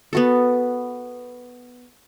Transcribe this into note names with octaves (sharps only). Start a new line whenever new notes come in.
B3 F#4 A4